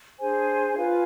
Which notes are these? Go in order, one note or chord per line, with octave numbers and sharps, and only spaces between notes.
D4 G#4 C5 G#5
F4 B4 F5 G#5